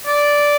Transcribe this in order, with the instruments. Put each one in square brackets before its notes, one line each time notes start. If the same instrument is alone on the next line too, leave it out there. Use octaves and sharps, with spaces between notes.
[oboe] D5